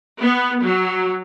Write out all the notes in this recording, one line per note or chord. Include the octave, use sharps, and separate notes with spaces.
B3
F#3